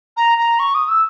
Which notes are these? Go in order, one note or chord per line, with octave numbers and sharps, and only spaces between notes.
A#5
A#5
C#6
D#6
E6